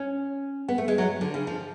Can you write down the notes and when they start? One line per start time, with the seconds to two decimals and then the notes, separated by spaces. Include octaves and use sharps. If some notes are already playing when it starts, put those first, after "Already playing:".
Already playing: C#4
0.68 B3
0.78 A3
0.88 G#3
0.98 F#3
1.21 D3
1.34 C#3
1.47 F3